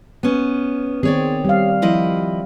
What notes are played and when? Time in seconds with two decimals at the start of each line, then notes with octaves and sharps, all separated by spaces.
0.23 B3 C#4
1.03 D#3 C4 G#4 C#5 D5
1.45 G3 F5
1.82 F3 E4 D#5